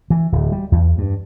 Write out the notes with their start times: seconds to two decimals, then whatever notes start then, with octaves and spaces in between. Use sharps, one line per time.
0.10 E3
0.32 D1
0.52 G3
0.72 E2
0.98 G2